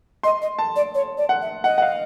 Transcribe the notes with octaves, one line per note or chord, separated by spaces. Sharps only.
D#5 C6
D#5
A5
D5
C#5
D5
F#5
E5
D#5 F#5
F#5
F5